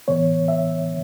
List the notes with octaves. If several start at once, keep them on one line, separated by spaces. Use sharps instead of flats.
A2 E3 B3 C#5
E5